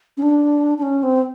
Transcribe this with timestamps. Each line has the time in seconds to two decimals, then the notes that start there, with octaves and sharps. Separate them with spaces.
0.17 C#4
0.22 D4
0.78 D4
0.83 C#4
1.03 C4